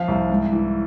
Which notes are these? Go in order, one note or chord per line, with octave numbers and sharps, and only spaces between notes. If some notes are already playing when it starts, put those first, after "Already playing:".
Already playing: F3 F5
C2
G#2
E3